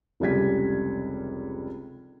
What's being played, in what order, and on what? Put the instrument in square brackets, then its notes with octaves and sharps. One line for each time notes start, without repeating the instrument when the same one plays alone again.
[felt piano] F1 C#2 G3 G#6 B6